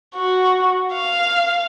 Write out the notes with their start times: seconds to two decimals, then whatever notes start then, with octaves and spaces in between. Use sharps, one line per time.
0.16 F#4
0.93 F5